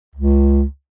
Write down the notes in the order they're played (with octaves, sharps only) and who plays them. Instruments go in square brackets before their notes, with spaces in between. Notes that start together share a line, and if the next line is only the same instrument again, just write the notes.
[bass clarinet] C#2